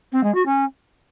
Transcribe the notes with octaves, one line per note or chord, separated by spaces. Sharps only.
C4
G#3
F#4
C#4